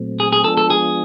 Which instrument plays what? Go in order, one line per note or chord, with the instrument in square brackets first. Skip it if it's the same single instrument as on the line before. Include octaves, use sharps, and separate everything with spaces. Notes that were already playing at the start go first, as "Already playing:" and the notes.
Already playing: [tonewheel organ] A#2 F#3 A3 C4
[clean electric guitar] G#4
G#4
[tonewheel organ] F3 G#3 B3 D4 F4 [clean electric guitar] A4
[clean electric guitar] A4
G#4